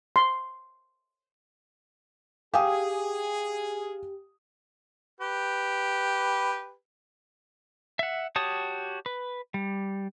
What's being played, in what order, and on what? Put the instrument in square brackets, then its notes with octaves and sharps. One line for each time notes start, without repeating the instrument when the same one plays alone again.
[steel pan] C6
[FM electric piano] G4 [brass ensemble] G#4 [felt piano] F5 G#5 D#6
[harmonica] G4 B4
[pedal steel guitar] E5 F#5
F#4 G4 C#5 A5 D#6
B4
G3